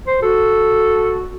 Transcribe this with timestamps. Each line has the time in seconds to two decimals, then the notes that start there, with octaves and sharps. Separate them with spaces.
0.07 C5
0.22 F#4 A4